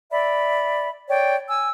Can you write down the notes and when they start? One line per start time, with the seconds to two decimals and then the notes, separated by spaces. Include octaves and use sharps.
0.12 D5 E5 B5
1.08 C#5 D5 G5
1.48 G#5 E6